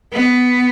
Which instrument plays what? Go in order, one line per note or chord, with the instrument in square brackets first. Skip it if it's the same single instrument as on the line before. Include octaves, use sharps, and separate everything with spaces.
[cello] B3